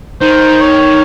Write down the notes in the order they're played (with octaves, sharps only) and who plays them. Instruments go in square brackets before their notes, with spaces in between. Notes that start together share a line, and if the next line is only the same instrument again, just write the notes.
[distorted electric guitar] D#3 [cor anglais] C5
[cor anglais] C#5